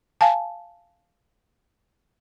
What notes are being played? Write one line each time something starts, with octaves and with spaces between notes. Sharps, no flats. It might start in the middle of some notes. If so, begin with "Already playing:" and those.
F5 G#5 A5